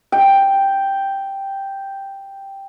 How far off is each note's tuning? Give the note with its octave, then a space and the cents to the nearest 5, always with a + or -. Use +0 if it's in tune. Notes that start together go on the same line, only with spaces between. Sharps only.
G5 +0